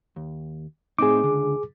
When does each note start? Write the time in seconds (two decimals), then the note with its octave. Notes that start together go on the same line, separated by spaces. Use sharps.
0.16 D#2
0.99 A2 C4 D#4 G#4 D6
1.23 C#2 D3